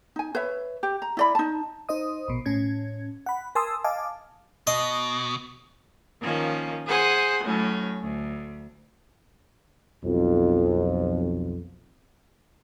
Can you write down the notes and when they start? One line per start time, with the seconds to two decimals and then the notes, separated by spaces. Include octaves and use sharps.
0.16 D#4 G#5
0.35 B4 C#5 E5
0.83 G4
1.02 A#5
1.17 E4 D5 B5
1.35 D#4 A5
1.89 D#4 C5 D#5 D#6
2.28 A#1 B2
2.46 A2 C#4 G#6
3.26 F#5 B5
3.55 A#4 G#5 A5 C6 D#6 E6
3.84 D#5 F5 G#5 A5 D6
4.67 B2 D#5
6.21 D#3 F3 A#3 C#4
6.86 G#4 C5 F#5 G#5
7.44 A2 F#3 C#4
8.01 D2
10.04 B1 F2